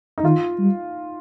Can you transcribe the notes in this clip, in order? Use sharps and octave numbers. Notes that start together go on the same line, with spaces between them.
D#4
D#3 F4
G3